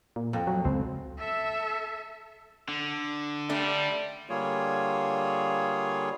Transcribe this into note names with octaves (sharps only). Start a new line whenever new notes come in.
A#2
F2
F#3
C#2 C4
A4 E5
D3
G3 A3 D4
D3 G3 A#3 F4 G#4 C#5